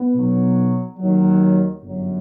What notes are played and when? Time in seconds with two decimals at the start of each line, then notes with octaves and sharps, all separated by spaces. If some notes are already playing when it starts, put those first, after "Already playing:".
Already playing: B3
0.14 B1 B2 F#3
0.98 D#2 D#3 F#3
1.81 G1 F#2 F#3